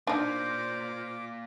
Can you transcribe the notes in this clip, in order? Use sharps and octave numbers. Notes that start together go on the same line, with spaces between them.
A#3 D4 D#4 C5 D5 D6